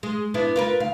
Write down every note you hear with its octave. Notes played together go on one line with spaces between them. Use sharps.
G#3
B3 D4 E4
F4 A#4 B4
D2 F5